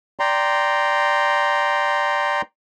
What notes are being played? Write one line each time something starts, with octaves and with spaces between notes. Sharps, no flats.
D5 G5 A#5 C6